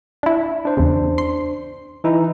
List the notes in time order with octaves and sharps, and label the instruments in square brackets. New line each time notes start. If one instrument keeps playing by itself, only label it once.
[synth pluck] D4 E4
[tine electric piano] D4 C5
[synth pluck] E2 C#3
C6
[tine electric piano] E3 D#4 E4